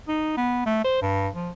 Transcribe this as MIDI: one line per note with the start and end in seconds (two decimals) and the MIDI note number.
0.08 0.37 63
0.37 0.61 59
0.66 0.81 57
0.84 0.97 72
1.02 1.28 43
1.35 1.50 53